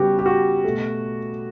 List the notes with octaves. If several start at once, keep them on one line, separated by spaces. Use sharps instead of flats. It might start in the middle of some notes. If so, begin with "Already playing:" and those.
Already playing: C#3 G3 B3 F#4 G4
G4
F#4
B2 A3